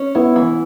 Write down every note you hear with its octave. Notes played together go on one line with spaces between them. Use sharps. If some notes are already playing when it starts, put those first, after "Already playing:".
Already playing: C#4
B3 E4
E3